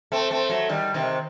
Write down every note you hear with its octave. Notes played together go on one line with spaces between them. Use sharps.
A3 C4
A3 C4
F#3 A3
D#3 G3
C3 D#3